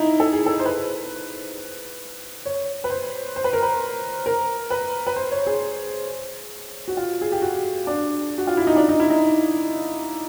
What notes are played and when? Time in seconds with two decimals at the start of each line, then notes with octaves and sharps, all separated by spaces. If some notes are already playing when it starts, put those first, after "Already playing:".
Already playing: D#4 E4
0.20 A4
0.33 G#4
0.46 A4
0.59 C5
0.65 B4
2.46 C#5
2.84 B4
2.90 C5
3.36 C5
3.44 B4
3.53 A#4
3.62 B4
4.26 A#4
4.70 B4
5.07 B4
5.16 C5
5.32 C#5
5.47 G#4
6.88 F#4
6.97 F4
7.21 G#4
7.32 G4
7.42 F#4
7.87 D4
8.38 F#4
8.47 F4
8.57 E4
8.67 D#4
8.76 D4
8.89 D#4
9.00 E4
9.10 D#4